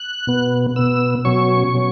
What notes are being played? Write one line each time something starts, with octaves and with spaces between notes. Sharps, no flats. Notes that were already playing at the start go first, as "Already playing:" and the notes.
Already playing: F#6
B2 B3
B2 B3 E6
B2 F#3 C#4 C#6
B2 F#3 C#4